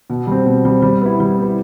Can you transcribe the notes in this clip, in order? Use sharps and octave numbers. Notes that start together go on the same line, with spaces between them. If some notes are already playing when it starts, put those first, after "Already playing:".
B2
G3 C4
B2
G3 C4
G3
B3 E4
G3
B3 E4